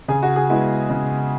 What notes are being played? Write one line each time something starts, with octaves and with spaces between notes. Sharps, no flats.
C#3 G#4
F#4
G#4
G#3 B3 E4
C#3